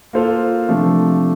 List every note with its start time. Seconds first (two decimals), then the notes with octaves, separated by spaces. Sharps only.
0.13 A#3 F4 A4 C5 F5
0.69 C3 F3 A3 D4